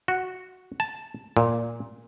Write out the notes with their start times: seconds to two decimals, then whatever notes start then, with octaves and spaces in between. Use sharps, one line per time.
0.08 F#4
0.80 A5
1.37 A#2